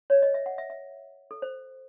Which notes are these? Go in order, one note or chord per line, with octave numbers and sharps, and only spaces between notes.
C#5
D#5
E5
F#5
E5
E5
A4
C5